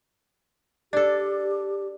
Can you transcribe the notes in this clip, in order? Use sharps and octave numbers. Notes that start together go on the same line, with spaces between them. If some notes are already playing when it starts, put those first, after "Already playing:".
D4 G4 A4 D5